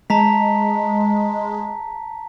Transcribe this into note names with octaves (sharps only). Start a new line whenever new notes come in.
G#3 A5 A#5 B6